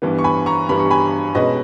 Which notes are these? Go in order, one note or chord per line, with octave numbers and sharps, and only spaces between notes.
G2 E3 G3 B3
C#6
G#5 B5
A#5 C#6
G2 E3 G3 B3 B5
C#6
G#5 B5
B2 G#3 C#4 B4 D#5